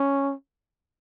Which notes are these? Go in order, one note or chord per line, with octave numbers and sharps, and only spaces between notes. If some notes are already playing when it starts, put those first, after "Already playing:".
Already playing: C#4